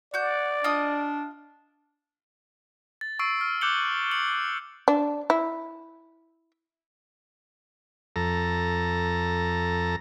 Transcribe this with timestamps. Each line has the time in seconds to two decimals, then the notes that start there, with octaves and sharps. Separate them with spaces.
0.14 F#4 D5 F#5 G6
0.64 D4 F4 D#5 D#6
3.01 A6
3.19 C#6 E6 C7 D7
3.41 F6
3.61 D6 F#6 G6 C#7 F#7 G7
4.11 C#7 F#7
4.88 D4
5.30 E4
8.16 F2 A4 A#5